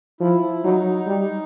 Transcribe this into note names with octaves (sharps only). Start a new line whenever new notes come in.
F3 E4
F#3 D#4
G3